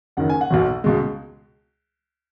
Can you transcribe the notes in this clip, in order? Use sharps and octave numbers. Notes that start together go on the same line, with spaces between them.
F#1 F#2 D#3 F#5
G#5
F#5
B1 B2 F#3
C#2 B2 G#3